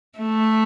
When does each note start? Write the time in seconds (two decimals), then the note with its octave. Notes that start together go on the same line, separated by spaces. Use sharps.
0.19 A3